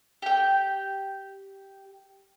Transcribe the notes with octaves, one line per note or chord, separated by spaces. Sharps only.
G4 G5